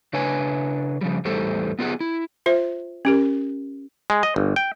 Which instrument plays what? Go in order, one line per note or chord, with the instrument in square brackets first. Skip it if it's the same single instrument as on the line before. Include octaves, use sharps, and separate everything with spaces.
[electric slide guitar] C#3 D4 B4 C#5 G#5
C#3 F3 G3
E2 A2 G3 G4 A4 C5
B3 F4 G4 G#4 F#5
E4
[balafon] F4 C5 E5
C#4 G4 A#4
[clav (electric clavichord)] G#3
D#5
G1
G5